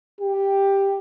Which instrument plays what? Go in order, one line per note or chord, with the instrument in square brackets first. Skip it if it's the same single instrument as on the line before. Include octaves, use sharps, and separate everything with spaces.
[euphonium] G4